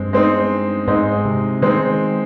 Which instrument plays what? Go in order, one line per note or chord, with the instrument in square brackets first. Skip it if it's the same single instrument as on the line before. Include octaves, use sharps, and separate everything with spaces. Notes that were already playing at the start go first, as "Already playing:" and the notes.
Already playing: [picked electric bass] G2 [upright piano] G#3 C4
[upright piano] G#3 C4 D#4
[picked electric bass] G#2 [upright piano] G#3 C4 D#4
[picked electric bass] C3
[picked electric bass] D#3 [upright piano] G#3 C4 D#4